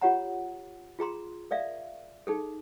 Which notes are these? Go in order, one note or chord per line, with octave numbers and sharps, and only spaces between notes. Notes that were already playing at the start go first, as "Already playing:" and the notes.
F4 G4 C#5 F#5 A#5
F4 G#4 A#5 C6
A#4 D5 E5 F5
D#4 G#4 A4